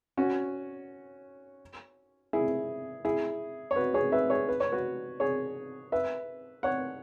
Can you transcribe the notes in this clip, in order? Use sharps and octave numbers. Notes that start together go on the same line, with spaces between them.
C#4 F#4
E4 G#4
E4 G#4
C#5
F#4 B4
G#4 C#5
B4 E5
G#4 C#5
B4
C#5
F#4 B4
G#4 C#5
B4 E5
C#5 F#5